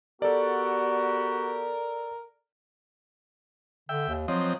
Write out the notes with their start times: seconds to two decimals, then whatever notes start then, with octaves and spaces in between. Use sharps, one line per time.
0.22 B3 F#4 G4 A4 A#4 D5
3.89 D3 E5 G5
4.08 D#2
4.28 F3 F#3 C4 D#5